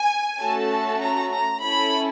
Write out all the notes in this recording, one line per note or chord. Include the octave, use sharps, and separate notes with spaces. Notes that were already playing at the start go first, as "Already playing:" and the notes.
Already playing: G#5
A3 C#4 F#4 A4 A5
A#5
A#5
C#4 E4 A4 B5